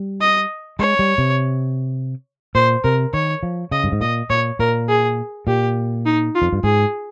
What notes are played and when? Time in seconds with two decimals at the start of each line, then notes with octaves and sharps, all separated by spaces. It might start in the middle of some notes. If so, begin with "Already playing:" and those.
Already playing: G3
0.21 D#5
0.79 G#3 C#5
0.99 G3
1.18 C3
2.54 A#2 C5
2.84 C3 A#4
3.13 D#3 C#5
3.43 F3
3.71 C#3 D#5
3.84 G2
3.92 G#2
4.01 A#2 D#5
4.30 A#2 C#5
4.59 A#2 A#4
4.88 G#4
5.47 A#2 G4
6.05 D#4
6.35 F4
6.42 F2
6.53 G2
6.64 G#2 G#4